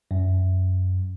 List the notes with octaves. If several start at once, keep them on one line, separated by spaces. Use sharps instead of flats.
F#2